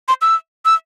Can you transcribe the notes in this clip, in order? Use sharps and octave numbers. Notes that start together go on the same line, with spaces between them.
C6
E6
E6